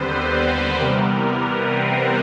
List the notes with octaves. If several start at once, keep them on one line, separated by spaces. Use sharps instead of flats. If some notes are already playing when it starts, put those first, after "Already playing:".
Already playing: D#2 D3 G3 B3 C4 B4 C5
C4 C5
B4
C3 E3 G3 B3 A#4
A#4
B4
C4 C5